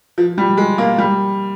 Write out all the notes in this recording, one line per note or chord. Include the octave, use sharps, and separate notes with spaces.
F3
G3
G#3
A#3
G3